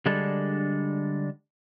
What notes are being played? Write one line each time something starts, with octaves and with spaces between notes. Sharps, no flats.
D3 G3 G#3 D4 A4